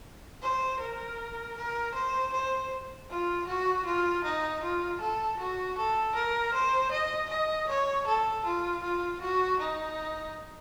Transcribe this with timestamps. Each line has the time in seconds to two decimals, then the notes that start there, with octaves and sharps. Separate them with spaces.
0.42 C5
0.79 A#4
1.57 A#4
1.94 C5
2.33 C5
3.10 F4
3.47 F#4
3.85 F4
4.24 D#4
4.63 F4
5.00 A4
5.39 F#4
5.77 A4
6.15 A#4
6.54 C5
6.91 D#5
7.29 D#5
7.69 C#5
8.07 A4
8.45 F4
8.83 F4
9.21 F#4
9.59 D#4